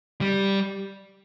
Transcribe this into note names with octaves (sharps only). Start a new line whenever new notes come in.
G3